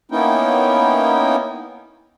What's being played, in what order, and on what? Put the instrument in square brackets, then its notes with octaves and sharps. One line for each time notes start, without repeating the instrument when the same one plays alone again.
[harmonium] A#3 B3 C#4 D#4 E4 G5